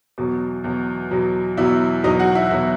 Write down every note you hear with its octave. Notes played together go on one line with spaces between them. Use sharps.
E2 B2 F#3
E2 B2 F#3
E2 B2 F#3
E2 B2 F#3 E4 E5
E2 B2 F#3 D#4 D#5
F#4 F#5
E4 E5
E2 B2 F#3 E4 E5